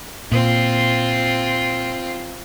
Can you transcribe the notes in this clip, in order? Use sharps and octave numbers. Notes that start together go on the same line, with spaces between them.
A#2 C4 F4